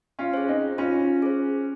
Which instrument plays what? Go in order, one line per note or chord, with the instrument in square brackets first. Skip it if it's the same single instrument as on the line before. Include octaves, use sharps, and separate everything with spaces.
[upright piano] C#4 F4
[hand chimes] G#4 C5
[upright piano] C4 D#4
[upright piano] C#4 [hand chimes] F4
[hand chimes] G#4 C5